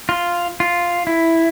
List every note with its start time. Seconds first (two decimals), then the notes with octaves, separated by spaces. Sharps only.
0.09 F4
0.60 F4
1.07 E4